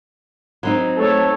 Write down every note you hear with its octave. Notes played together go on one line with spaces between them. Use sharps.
F#3 C4 D#4
A3 A4 C#5